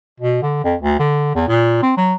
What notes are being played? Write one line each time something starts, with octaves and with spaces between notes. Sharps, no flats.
B2
D3
F2
D2
D3
E2
A#2
C4
F#3